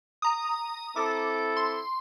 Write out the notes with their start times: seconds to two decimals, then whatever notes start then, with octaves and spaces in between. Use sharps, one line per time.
0.22 A#5 D#6
0.96 C4 E4 A4 D6
1.57 C6